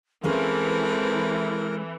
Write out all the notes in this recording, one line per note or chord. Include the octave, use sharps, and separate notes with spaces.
E3 G#3 C4 C#4 A4 A#4 F5